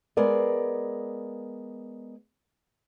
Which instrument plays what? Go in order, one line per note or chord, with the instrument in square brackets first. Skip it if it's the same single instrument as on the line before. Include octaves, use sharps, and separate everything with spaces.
[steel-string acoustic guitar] G#3 B3 A#4 D5